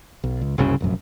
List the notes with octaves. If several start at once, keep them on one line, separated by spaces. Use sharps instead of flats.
B1
C#2
F#1 C2 C#3 C#4
F1 A#1 F#2